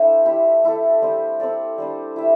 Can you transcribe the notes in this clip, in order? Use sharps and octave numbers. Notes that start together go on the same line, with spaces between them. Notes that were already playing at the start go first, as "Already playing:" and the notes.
Already playing: G3 D4 E4 A4 C5 E5
E4 G4 E5
A3 E4 A4
G3 C4 G4 C5
C4 A4 D5
G3 D4 C5
E4 G4 E5